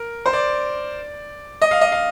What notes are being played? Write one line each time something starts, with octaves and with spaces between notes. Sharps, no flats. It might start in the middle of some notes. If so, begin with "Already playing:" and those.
Already playing: A#4
C5
D5
D#5
F5
D#5
F5